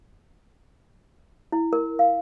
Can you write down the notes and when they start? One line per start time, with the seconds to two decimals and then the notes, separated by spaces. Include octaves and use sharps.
1.52 E4
1.73 A#4
1.99 F5